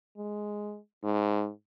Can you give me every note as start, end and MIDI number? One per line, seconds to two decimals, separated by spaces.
0.17 0.79 56
1.03 1.50 44